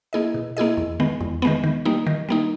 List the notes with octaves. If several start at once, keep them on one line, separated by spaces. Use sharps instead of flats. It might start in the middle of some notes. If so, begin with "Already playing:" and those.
A#3 E4 G#4 D#5
B2
A#3 E4 G#4 D#5
E2
D#3 G#3 B3
E2
D#3 G#3 B3
D#3
G3 A#3 D#4
D#3
G3 A#3 D#4